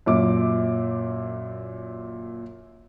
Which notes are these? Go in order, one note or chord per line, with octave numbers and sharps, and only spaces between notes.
F#2 A#2 D6